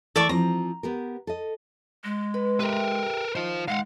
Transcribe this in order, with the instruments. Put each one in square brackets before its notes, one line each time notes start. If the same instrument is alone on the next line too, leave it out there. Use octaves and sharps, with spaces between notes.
[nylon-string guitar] E3 A3 [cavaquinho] A4 D5 C#6
[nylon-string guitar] F3 C4 [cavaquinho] A#5
[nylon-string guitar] B3 G4 A#4
A4 D#5
[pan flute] G#3
[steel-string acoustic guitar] B4
[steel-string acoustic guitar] G4 E5 G5 [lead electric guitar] A#4 B4
[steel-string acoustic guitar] D#3 [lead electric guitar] F4 C5
[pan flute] G#3 [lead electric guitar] F5 F#5